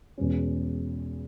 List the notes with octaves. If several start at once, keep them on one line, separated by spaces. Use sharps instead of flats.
E2 B2 G#3 C#4